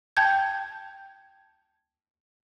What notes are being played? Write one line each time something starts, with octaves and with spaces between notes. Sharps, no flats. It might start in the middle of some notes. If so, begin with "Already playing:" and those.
G5 A5 G6 G#6